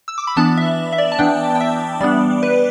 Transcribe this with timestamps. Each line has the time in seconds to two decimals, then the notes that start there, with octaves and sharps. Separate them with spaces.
0.08 E6
0.18 D6
0.27 B5
0.36 E3 B3 D4 A5
0.57 E5
0.92 E5
0.98 D5
1.12 A5
1.19 E3 B3 D4 G5
1.55 G5
1.61 E5
2.01 G3 B3 D4 D5
2.43 B4